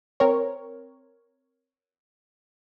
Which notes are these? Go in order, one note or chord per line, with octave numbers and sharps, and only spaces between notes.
C4 A#4 C#5